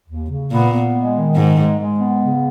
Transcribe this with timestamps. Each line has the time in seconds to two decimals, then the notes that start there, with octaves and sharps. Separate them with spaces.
0.09 D#2
0.30 C#3
0.52 A#2 B3
0.73 B3
0.95 G#3
1.15 D#3
1.36 G#2 G#3
1.57 G#3
1.78 G#3
1.99 B3
2.21 C#3